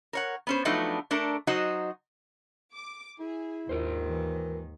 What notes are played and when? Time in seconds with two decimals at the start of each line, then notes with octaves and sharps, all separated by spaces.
0.13 A#4 C#5 F#5
0.47 B3 C#4 C5
0.65 F3 F#3 A3 B3 D4 D#4
1.11 A3 D4 A4 A#4
1.47 F#3 D#4 F#4 C5 D#5
2.73 D6
3.19 E4 G#4
3.69 D#2 G#2 D#3 F4 A#4 C5
4.10 E3